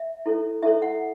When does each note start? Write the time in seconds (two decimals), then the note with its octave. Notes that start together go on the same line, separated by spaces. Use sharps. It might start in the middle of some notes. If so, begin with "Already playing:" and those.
Already playing: E5
0.26 E4 A4 C#5
0.62 E4 A4 C#5 E5
0.82 F#5